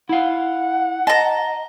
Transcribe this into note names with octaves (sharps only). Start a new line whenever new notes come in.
E4 F5 F#5
D#5 A5 A#5